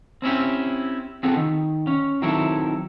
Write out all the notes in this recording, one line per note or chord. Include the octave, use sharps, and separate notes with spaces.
C4 C#4 E4 G4
B3 C4 F4 G#4 A4
D#3
C#4
D#3 F#3 C4 E4 A4